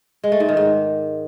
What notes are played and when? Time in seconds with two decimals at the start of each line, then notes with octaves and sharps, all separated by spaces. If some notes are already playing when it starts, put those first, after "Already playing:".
0.24 G#3
0.32 A3
0.40 G#2
0.49 D#3
0.57 G#2